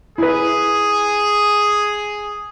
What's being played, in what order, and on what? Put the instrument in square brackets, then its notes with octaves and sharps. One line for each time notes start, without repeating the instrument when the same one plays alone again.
[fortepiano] E4 B4 [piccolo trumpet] G#4